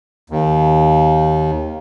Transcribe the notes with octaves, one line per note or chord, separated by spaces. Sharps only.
D#2